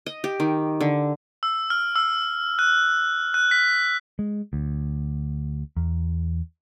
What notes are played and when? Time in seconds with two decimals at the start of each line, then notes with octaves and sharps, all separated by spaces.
0.06 D#5
0.24 G4
0.40 D#3
0.81 D3
1.43 E6
1.70 F6
1.95 E6
2.59 F#6
3.34 F#6
3.51 B6
4.19 G#3
4.53 D2
5.77 E2